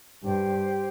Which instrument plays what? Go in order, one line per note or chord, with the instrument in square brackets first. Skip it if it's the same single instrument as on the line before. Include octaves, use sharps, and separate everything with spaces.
[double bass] G2 [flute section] G4 C5 G5